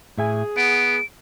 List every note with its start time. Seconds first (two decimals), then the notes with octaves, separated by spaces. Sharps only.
0.18 A2 G#4 E5 G#5
0.57 B3 F#5 D7